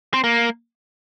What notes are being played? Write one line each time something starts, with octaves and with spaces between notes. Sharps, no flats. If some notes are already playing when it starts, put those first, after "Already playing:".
C4
A#3